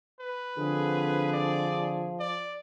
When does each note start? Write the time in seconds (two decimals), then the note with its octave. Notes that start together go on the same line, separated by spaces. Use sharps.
0.21 B4
0.57 D3 F3 C4 G#4
1.33 D5
2.20 D5